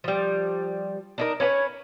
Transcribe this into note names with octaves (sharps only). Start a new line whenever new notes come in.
F3 G3
D4 D#4 A#4
C#4 D4 B4 C#5